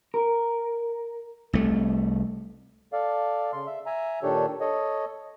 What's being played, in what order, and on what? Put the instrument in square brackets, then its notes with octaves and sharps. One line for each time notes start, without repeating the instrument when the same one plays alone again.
[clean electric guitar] A#4
[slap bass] C2 A3
[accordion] A4 D5 F5
C#3 C6
E5
E5 G#5 A#5
A#2 D#3 D4 G4 A4 C#5
A4 C#5 D#5